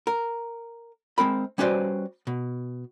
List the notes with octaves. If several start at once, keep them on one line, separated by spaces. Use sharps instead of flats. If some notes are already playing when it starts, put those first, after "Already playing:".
A#4
G#3 C4 A#4 B5
G3 C#4 F#4 B4 C5 D5
B2